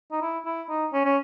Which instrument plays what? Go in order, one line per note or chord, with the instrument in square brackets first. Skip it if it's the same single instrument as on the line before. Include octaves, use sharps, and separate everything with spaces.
[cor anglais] D#4
E4
E4
D#4
C#4
C#4